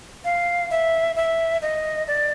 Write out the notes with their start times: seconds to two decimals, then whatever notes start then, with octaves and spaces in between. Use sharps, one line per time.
0.24 F5
0.71 E5
1.16 E5
1.62 D#5
2.08 D5